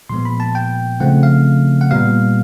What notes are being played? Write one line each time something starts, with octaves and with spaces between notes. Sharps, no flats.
A#2 F3 G#3 B3 C6
B5
A5
G5
C#3 F3 A3 C4 F#5
F5
F#5
A#2 G3 B3 F5